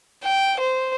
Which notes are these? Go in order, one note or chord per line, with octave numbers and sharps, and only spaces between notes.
G5
C5